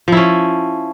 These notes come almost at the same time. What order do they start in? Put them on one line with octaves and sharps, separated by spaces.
F3 E4 C#4